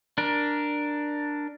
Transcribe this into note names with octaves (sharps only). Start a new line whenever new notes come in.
D4 A#4